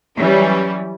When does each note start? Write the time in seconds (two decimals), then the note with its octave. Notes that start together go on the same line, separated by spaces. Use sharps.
0.18 E3 F#3 G3 C#4